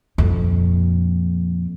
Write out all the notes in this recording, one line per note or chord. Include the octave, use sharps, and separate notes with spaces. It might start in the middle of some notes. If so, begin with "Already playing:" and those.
F2 A#2